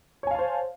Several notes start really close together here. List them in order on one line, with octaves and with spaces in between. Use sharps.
C#5 G#5 F5 A5 C5